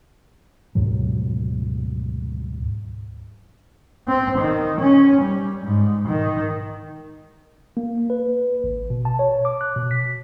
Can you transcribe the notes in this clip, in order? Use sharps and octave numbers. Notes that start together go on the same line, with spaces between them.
D2 G#2 B2 F#3
C4
D#3
C#4
G3
G#2
D#3
A#3
B4
G#1
B2
A5
C#5
D6
F#6
B2
B6